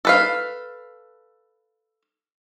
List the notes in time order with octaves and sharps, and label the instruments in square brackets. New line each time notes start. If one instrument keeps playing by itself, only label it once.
[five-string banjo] A4 B4 F5